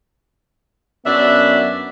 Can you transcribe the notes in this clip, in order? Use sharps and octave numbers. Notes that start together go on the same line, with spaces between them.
F#2 B3 D4 E5